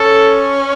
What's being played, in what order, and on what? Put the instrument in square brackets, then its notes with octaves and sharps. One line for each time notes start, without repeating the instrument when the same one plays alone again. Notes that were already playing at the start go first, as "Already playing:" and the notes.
Already playing: [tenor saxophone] C#4 [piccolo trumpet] A4